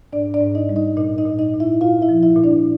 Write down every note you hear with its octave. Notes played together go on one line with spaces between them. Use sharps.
G#2 D4 D5
D4 D5
G#2
D#4 D#5
G3
D#4 D#5
A#2 D#4 D#5
D#4 D#5
A#2
D#4 D#5
A#2
E4 E5
A#2 F4 F5
E4 E5
F3
E4 E5
A#2
D4 D5